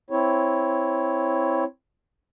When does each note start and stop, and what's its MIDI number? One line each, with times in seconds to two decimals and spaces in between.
0.10 1.64 60
0.10 1.64 64
0.10 1.64 73